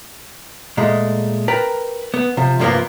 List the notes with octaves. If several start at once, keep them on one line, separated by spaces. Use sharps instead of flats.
A#2 G#3 A3
A#4 B4 G5 A5
B3
C3 F3
G2 C3 F3 G3 A#3 B3